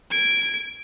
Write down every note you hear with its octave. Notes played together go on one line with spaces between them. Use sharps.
G#6 D7